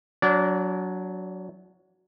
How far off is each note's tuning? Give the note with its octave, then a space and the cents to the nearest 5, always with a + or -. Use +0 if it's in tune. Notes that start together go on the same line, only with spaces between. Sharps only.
F#3 +0 D4 -25 D5 -25